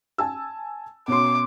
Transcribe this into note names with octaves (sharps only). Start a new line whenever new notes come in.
G#5 A5 E6
B2 C#4 C6 D6